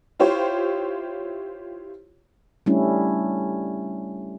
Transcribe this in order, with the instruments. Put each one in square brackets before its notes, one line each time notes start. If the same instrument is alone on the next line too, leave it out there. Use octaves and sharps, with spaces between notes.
[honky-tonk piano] E4 F4 G4 C5 C#5
[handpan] G3 A3 C#4 D4 E4